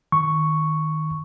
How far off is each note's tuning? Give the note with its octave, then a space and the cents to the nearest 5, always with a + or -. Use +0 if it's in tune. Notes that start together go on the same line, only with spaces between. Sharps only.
D#3 +0 C#6 +0